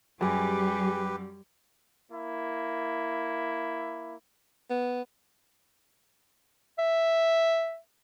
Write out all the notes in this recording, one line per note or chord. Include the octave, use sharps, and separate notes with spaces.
F#2 G3 G4 G#4 B4 G#5
A#3 E4
B3
E5